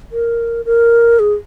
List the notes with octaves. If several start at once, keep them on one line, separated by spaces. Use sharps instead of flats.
A#4
A#4
G#4